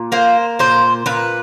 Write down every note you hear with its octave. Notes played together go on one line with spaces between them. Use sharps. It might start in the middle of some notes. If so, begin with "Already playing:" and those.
Already playing: A#2
A#3 C5
A#2 C5
A#2 B4